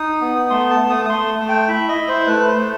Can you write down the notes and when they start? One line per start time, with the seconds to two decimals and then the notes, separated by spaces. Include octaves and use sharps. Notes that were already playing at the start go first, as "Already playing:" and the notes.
Already playing: D#4 D#6
0.21 B3
0.50 A3 C6
0.70 A5
0.80 A3
0.90 D#6
1.05 D#6
1.10 A3 C6
1.39 A3
1.49 G5
1.68 E4 E5
1.88 D#5
1.98 E4
2.08 C5
2.27 A3 B4
2.47 C5
2.57 A3